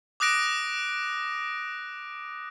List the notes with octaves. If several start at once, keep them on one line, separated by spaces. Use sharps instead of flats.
D6 D#6 F#6 A#6 D7